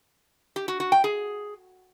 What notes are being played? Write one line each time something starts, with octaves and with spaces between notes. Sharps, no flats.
G4
F#4
F#4
G5
G#4